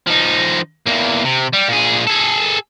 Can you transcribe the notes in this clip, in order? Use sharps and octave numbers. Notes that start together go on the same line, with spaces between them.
F3 D#4
E2 A#3
C3
G3
A#2 G#4
G#4 A4